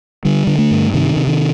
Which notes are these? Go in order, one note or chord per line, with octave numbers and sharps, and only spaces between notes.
D3 G3
D3
A3
G2
C3 D#3
C3
D#3